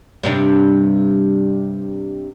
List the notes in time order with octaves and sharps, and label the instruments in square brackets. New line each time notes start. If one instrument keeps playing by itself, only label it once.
[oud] G2 C3 D4